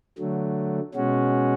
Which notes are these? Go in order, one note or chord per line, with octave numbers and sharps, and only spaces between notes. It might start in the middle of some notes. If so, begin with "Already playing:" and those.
D3 F#3 A3
B2 G#3 C#4 F#4